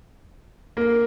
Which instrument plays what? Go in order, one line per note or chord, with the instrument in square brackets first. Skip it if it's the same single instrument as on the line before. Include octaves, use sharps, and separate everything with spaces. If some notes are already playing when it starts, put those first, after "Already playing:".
[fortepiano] A#3